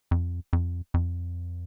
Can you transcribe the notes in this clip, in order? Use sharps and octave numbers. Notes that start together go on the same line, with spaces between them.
F2
F2
F2